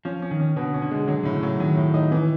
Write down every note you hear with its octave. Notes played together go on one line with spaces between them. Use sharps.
F3 C#4
C#4
D#3
C#4
B2 D3
C#4
D3
G#3
D3 F#3
A2 D3
C#3
F#3
D#3 F#3
A2
D#4
E3